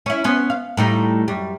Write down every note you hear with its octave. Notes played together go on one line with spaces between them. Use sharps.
C#4 E4
B3 C#4 C5
F5
A2 G3 D#4
F#2 G3